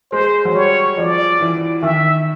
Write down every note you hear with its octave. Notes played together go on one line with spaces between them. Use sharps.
G#3 C5
F#3
G3 C#5
F3 D5
E3
D#3 E5